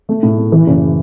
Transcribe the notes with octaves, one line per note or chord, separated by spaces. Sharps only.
A3
A2
A3
E3
F#1